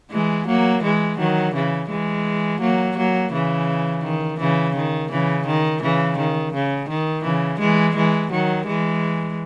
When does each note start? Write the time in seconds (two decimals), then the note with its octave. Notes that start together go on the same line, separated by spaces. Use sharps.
0.12 E3 G#3
0.47 F#3 A#3
0.83 E3 G#3
1.18 D#3 F#3
1.55 C#3 E3
1.90 E3 G#3
2.61 F#3 A#3
2.97 F#3 A#3
3.32 C#3 E3
4.04 D#3
4.40 C#3 E3
4.76 D#3
5.11 C#3 E3
5.46 D#3
5.82 C#3 E3
6.18 D#3
6.54 C#3
6.89 D#3
7.24 C#3 E3
7.60 E3 G#3
7.96 E3 G#3
8.31 D#3 F#3
8.67 E3 G#3